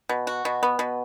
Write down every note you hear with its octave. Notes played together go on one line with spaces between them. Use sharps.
B2
F#4
B2
B3
B2